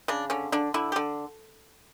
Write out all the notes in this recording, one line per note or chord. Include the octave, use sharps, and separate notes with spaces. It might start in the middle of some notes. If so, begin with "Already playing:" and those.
C#3 D4
D3 C#4
D3 D4
D3 E4
G4
D3